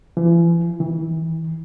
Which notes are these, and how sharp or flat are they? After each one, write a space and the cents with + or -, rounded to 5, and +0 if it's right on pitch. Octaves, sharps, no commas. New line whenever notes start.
E3 +40
E3 -30